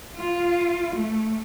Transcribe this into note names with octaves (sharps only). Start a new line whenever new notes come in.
F4
A3